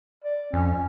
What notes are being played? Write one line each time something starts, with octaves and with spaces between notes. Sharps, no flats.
D5
F2 C#4